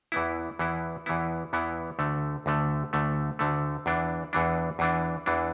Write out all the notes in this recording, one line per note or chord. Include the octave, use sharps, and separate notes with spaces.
E2 E3 B3 E4
E2 E3 B3 E4
E2 E3 B3 E4
E2 E3 B3 E4
D2 D3 A3
D2 D3 A3
D2 D3 A3
D2 D3 A3
E2 E3 D4
E2 E3 D4
E2 E3 D4
E2 E3 D4